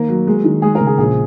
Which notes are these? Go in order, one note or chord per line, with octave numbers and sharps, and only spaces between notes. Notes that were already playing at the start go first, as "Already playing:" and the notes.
Already playing: D#3 A#3
F#3
G#3
D#3
G#3 G#4
A#4
C#3
G#4
A#1 G#4